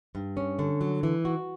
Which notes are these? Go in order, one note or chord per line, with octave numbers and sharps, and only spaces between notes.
G2
C#4
D3
F#3
E3
F#4